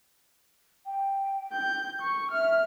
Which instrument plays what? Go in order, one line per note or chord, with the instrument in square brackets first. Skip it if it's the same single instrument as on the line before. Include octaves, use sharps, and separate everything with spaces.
[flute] G5
[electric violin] G6
C#6
[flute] E5 [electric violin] F6